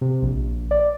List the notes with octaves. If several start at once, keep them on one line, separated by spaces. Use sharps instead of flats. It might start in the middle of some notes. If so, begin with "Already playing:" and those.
C3
A#1
D5